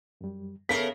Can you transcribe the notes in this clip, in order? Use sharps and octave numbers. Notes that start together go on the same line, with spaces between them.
F#2 G3
C#3 B3 A4 A#4 E5 B6 C7